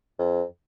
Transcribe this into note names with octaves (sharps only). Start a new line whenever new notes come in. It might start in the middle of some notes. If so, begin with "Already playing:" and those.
F2